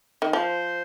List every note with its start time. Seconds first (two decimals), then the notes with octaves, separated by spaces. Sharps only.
0.22 D#3
0.33 F3 C5